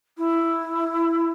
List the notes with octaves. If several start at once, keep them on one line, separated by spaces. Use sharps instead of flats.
E4